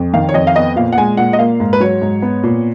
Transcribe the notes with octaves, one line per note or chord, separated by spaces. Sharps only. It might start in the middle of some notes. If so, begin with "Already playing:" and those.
Already playing: F2
D#3 F5
C#5
F2 D#5
F5
B3 D#5
A#2 F5
F#5
G#3 G#5
A#2 F#5
D#5
A#3 F5
G#2
B4
F#3 C#5
G#2
B3
A#2